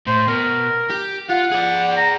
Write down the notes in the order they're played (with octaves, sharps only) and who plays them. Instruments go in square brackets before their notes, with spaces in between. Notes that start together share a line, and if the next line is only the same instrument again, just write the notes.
[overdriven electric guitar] A2 [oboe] C5
[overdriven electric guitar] B2 [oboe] A#4
[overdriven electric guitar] G4
[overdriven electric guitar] F4 [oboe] F#5
[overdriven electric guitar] G#4 D5
[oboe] A#5